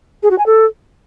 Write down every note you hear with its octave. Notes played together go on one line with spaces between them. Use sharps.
G#4
F#4
G#5
A4